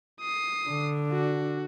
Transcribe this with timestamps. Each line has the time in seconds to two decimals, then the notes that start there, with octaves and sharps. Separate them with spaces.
0.20 D#6 C7
0.69 D3 D4
1.12 F#4